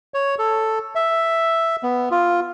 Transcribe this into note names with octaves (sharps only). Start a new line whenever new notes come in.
C#5
A4
E5
B3
F4